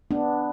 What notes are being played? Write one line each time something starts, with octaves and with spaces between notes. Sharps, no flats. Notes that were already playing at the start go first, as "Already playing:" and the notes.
B3 D4